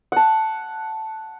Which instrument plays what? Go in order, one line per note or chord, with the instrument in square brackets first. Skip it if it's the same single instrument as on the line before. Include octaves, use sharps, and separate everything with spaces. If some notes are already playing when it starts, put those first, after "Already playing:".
[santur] F#5 A5